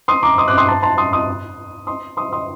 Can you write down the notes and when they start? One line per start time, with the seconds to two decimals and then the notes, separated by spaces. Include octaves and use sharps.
0.08 C6 D#6
0.23 A#5 D6
0.38 C6 D#6
0.48 D6 F#6
0.57 C6 D#6
0.68 A5 C6
0.82 A5 C6
0.98 C6 D#6
1.13 C6 D#6
1.87 C6 D#6
2.17 C6 D#6
2.33 C6 D#6